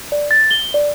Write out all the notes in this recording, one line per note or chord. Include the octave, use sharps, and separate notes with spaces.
D5
A6
G7
D5